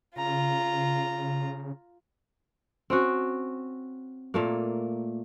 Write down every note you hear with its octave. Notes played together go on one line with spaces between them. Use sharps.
C#3 F4 A#5
C4 C#4 F#4
A#2 A3 A#3